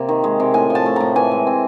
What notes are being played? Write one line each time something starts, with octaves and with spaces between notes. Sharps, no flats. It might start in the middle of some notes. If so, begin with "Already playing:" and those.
Already playing: C3 A#3
D#3
G#3
C3
A2 G#5
F3
A5
A3
A2 A#5
E3 G#5
G#3
C4